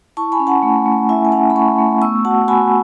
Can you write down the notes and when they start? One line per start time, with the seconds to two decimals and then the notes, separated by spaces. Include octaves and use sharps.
0.17 E4 A5 C#6
0.32 G#5 B5
0.40 C#4
0.47 F#5 A5
0.63 A3
0.86 A3
1.09 E4 E5 G#5
1.25 G#5
1.32 C#4 F#5 A5
1.50 B5
1.55 A3 A5 C#6
1.78 A3
2.02 B3 C#6 E6
2.25 F#4 F#5 A5
2.48 F#4 G#5 B5